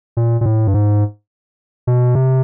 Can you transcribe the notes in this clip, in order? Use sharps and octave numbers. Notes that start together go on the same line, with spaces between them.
A#2
A#2
A2
G2
G#2
B2
C3